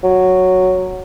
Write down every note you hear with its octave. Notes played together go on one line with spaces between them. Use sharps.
F#3